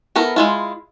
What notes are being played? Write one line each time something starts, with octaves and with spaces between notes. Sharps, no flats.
B3 E4 A4 A#4
G#3 E4 F4